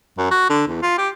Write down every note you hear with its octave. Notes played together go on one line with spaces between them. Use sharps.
F#2
F#4
D3
E2
F4
G4